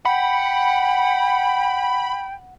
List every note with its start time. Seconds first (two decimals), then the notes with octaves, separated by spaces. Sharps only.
0.05 F#5 G5 B5